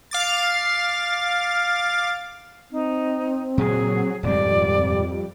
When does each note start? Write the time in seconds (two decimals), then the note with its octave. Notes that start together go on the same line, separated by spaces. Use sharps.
0.11 F5 D6 A6
2.72 C4 D#4
3.58 A#2 C#3 F#3 G#4
4.23 D#1 F2 G#2 G3 C4 D5